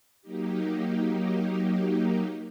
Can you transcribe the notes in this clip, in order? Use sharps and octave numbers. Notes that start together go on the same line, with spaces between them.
F#3 A#3 D#4 G4